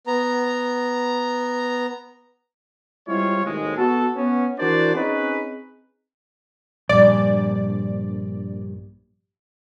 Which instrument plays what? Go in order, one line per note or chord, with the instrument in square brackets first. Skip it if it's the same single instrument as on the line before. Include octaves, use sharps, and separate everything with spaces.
[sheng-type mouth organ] B3 A#5
[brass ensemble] G3 G#3 C4 E4 F4 C#5
G#1 D#2 A2 C3 G#3
B3 F#4 A4
B3 C#4
E3 D4 F#4 A#4 C5 D5
C4 C#4 D#4 G#4 B4
[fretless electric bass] A#1 G2 [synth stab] D5